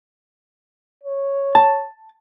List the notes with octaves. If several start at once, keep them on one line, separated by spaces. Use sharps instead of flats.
C#5
A5